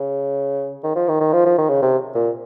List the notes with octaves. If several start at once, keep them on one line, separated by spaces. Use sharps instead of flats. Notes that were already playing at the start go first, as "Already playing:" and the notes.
Already playing: C#3
D#3
F3
D#3
D#3
F3
F3
D#3
C#3
C3
A#2